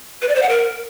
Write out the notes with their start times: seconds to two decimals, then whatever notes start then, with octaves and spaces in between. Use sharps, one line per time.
0.22 B4
0.29 D5
0.36 C5
0.42 F#5
0.49 A#4